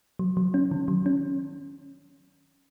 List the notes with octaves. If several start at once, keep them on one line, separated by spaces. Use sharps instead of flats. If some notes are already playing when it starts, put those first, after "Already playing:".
F#3
F#3
C#4
D#3
F#3
C#4